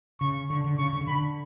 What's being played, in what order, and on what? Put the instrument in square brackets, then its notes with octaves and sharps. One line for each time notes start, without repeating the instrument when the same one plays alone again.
[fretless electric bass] C#3 [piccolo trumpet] C#6
[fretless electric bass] D3 [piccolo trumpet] C#6
[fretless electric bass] D3
[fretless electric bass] C#3 [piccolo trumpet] C#6
[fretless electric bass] D3
C#3
[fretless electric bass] D3 [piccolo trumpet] B5